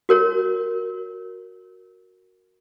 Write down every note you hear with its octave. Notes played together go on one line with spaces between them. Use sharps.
F#4 A#4 C#5